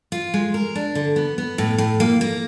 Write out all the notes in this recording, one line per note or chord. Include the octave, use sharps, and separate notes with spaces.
F4
G#3
A#4
D4
D3
B3
B3
A2
A2
A#3
A#3